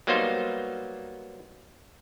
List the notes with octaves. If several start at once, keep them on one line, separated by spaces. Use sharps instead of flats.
F#3 G3 A#3 B3 D#4 C5